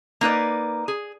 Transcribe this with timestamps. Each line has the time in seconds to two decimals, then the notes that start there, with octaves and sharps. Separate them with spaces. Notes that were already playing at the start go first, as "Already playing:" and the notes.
0.21 A#3 D#4 B4 D5
0.88 G#4